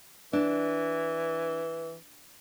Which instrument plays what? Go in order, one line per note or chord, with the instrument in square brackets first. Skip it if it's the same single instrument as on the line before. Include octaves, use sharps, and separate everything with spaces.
[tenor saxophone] E3 [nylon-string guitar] D4